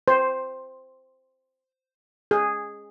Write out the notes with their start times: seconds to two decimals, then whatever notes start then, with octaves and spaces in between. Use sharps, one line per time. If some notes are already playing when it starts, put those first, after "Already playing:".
0.08 C5
2.31 G#4